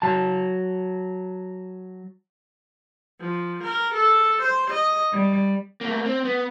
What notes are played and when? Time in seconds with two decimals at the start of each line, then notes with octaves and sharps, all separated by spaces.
0.02 F#3 A5
3.20 F3
3.63 A#4
3.95 A4
4.41 C5
4.71 D#5
5.12 G3
5.81 A3 A#3
6.06 C4
6.25 B3